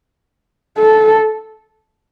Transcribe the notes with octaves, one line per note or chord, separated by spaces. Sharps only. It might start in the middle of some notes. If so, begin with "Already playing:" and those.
A4